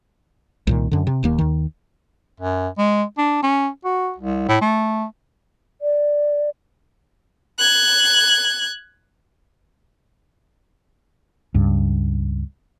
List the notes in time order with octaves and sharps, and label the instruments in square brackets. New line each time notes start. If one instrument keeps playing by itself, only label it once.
[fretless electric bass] C2 A#2 D#3
F#2 D3
C3
D#1 D#2 A#3
D#2 D#3
[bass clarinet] F#2
G#3
D4
C#4
F#4
C2
A2
A3
[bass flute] D5
[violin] F#6 G#6
[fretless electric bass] C#2 G2